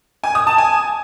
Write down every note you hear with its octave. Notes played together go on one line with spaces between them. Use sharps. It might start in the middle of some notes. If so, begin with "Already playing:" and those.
G#5
D#6
A5
G#5